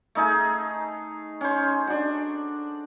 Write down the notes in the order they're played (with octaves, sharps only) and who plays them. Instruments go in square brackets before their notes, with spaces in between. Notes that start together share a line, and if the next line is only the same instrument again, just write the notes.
[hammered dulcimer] A3 D#4 G#4
C#4 C5
D4 F#4